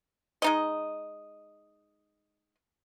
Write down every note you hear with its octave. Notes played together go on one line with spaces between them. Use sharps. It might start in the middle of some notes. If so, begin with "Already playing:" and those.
G#3 D#4 D#5